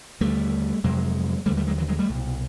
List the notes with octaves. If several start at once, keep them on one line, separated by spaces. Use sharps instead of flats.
D#2 D3 G3 A3
F2 C3 F#3 G#3
D#2 D3 G3 A3
G3 A3
F#3 G#3
E3 F#3
F#3 G#3
G3 A3
C2 B2